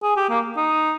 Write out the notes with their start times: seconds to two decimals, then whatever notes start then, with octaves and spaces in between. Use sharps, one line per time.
0.03 G#4
0.17 G4
0.30 A#3
0.57 D#4